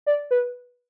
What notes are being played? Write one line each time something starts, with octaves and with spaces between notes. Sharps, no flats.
D5
B4